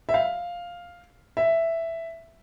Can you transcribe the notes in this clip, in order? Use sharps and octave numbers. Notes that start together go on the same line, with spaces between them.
E5
F5
E5